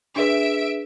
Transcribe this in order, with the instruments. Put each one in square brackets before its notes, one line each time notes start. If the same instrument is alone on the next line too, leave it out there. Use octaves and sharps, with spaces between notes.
[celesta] D4 G#4 B4 [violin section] E5 D7